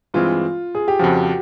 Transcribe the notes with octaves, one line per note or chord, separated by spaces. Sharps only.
G2 E3 G#3 C4 F4
G#4
G4
F2 C#3 F3 F#4